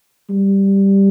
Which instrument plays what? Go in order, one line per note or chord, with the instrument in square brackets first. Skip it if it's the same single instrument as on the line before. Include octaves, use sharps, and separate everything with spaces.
[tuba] G3